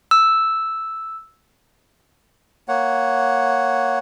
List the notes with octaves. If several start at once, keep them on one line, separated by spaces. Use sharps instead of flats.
E6
A#3 C#5 F#5